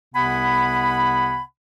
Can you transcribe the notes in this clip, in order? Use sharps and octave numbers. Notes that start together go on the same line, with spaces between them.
C2 C3 B3 F#5 G#5 B5